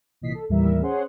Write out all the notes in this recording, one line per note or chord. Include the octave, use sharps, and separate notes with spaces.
C2 A#2 E3 D#5 B6 C7
A4
D#2 A2 E3 G3 A#4 E5
C#4 G#4 C5 C#5 F#5 C6